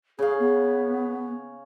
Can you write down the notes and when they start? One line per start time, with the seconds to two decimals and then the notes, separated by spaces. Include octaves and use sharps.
0.19 C#3 G#4 F5
0.39 B3